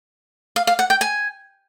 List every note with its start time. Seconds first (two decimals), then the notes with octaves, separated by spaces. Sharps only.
0.56 F5
0.67 F5
0.79 F#5
0.90 G5
1.01 G#5